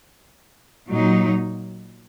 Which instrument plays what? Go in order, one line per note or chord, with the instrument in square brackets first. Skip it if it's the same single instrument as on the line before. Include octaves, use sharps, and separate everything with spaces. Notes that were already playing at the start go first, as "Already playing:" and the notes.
[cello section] A#2 F#3 D#4